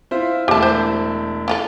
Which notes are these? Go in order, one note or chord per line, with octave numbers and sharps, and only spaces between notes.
E4 F4 C5
E1 A3 E4 G4 A5
C5
E4 F4 A4